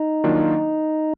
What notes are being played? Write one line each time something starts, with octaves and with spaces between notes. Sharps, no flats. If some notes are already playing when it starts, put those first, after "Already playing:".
Already playing: D#4
D#3 F#3 A#3 D4 F4